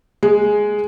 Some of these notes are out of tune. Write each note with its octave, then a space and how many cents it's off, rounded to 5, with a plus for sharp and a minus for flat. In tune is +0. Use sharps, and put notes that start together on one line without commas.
G#3 +5